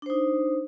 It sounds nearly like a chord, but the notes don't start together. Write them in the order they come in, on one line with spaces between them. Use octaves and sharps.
D4 C5 D#4